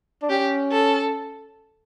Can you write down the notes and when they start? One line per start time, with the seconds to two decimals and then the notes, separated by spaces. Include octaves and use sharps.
0.23 D4
0.30 C#4 G4
0.72 A4